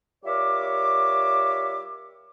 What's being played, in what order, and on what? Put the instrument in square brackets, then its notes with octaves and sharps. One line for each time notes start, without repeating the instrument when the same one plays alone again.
[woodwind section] G3 F4 A#4 C#5 E5 D6